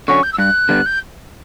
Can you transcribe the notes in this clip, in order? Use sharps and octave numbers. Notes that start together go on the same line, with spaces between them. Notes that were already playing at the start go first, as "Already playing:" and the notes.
D3 F#3 C#4 C#6
G6
E6
G2 F#6
D3 G3 B3
G6